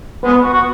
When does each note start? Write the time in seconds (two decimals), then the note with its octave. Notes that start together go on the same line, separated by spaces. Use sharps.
0.24 G#3 B3
0.43 F#4
0.53 F#4